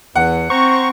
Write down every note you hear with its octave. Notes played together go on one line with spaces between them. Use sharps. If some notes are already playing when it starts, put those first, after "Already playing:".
E2 F#5
C4 C5 A#5 C#6